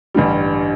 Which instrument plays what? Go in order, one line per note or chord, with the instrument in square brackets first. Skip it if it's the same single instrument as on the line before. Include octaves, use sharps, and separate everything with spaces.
[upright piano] A1 G2 D3 G3